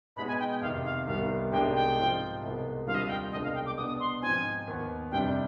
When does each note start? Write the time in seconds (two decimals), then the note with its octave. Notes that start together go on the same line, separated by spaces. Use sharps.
0.16 B2 G#3 B3 D#4 B5
0.28 G#5
0.39 G5
0.50 G5
0.61 F2 C3 D#3 F5
0.84 F5
1.06 C2 C3 D#3 G3 B3 F5
1.52 C2 B2 G#3 D4 G4 G5
1.74 G5
1.97 G#2 F3 C4 F4
2.42 C2 B2 G#3 B3
2.86 D#2 D3 G3 C4 F4 F5
2.95 D#5
3.02 F5
3.09 G5
3.32 C2 B2 G#3 D4 D#5
3.43 F5
3.54 G5
3.66 D6
3.77 B2 B3 D4 D#6
3.88 D#6
4.00 C6
4.22 G#2 F3 C4 G#5
4.67 D#2 D#3 B3
5.11 F2 C3 G3 D4 G5